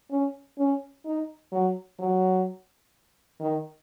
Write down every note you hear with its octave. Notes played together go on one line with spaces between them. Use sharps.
C#4
C#4
D#4
F#3
F#3
D#3